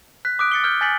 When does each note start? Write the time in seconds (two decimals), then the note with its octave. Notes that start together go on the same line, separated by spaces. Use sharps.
0.25 F#6 B6
0.39 D6 D#6 F#6 D7
0.52 A6 C#7 G7
0.64 F6 G6 G7
0.81 G#5 G6 A6 B6 C#7 F#7